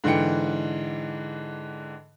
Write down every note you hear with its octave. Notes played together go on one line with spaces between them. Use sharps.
G#2 D3 E3 G5 C#7